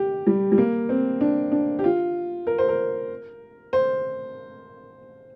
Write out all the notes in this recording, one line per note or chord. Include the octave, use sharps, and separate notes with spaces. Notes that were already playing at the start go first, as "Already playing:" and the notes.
Already playing: G4
G3
G3
A#3
C4
D4
D4
G4
F4
A#4
C5
A#4
C5